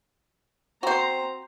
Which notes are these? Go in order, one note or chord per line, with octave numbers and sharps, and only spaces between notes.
C4 F#4 C5 A#5